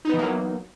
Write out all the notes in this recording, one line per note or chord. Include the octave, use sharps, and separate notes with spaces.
E3 F#3 A#3 B3 D#4